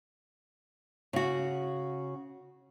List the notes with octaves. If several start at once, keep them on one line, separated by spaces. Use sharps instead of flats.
C#3 F#4